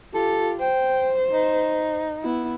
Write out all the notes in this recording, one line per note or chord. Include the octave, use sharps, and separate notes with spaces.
F4 G4 A4
C5 G5
D#4
B3 E4